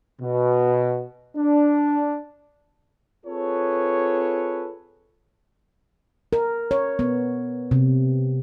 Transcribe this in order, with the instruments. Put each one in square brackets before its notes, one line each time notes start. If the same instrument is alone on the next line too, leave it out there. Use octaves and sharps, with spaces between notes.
[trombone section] B2
D4
[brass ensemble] C4 F4 G#4 A4 B4 C#5
[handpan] A#4
C#5
B3
C3